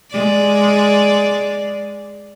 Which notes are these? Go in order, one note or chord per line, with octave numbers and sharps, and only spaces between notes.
G#3 D5